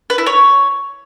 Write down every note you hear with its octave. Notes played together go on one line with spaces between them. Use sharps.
B4
E4
C#5